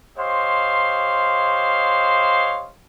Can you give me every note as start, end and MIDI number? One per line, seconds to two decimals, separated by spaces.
0.18 2.69 67
0.18 2.69 72
0.18 2.69 73
0.18 2.69 75
0.18 2.69 77
0.18 2.69 84